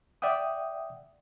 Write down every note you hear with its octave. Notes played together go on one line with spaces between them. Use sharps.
D5 E5 F#5 G5 D#6